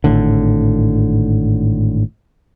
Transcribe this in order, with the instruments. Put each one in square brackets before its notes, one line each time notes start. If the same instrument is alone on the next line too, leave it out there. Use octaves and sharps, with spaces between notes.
[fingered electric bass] G#1 A2 D3